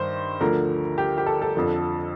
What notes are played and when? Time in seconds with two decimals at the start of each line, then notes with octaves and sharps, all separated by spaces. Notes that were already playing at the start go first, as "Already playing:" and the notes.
Already playing: G2 D#3 C5
0.40 D2 D3 F3 A#4
0.98 G4
1.18 G4
1.26 A4
1.42 A4
1.55 F2 D3 F3